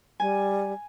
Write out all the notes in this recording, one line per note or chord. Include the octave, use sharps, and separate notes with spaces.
G3 G#5